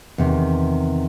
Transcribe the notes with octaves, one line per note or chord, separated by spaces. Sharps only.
E2 C3 D#3